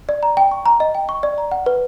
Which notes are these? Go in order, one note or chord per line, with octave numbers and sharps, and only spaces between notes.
D5
A#5
G5
C#6
A#5
D#5
G5
C#6
D5
A#5
F#5
B4